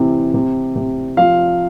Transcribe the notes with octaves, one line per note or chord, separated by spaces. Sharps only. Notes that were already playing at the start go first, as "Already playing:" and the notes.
Already playing: C3 E3
C3
C3
F3 F5